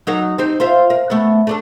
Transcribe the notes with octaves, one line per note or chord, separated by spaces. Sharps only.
F#3 D#4 A#4
C4 D#4 G4
F4 C5 E5
A#4
A3 B3
A3 D4 A4